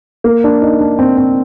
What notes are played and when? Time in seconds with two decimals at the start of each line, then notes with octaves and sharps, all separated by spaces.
0.24 A#3
0.44 D4
0.62 D#4
0.81 D4
0.99 C4
1.18 C4